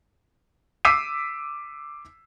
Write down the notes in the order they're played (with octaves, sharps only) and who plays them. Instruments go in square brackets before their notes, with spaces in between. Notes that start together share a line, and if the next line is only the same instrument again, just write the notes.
[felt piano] D6 E6 B6 C7 D#7